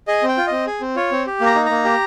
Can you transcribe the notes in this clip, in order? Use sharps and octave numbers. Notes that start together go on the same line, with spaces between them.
G#4 D#5
C4
G5
F4
C4 D#5
G#4
C4
F4 C#5
C4
G4
A#3
A#5
D#4
A#3 A#5
G4